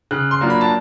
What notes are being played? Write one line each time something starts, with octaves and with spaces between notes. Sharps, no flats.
C#3 F#6
C6
F#3 A#3 D4 F4
B5
A5